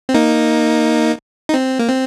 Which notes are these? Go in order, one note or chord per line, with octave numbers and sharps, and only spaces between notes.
C4
A#3 D#4
D#4
C4
A#3
C4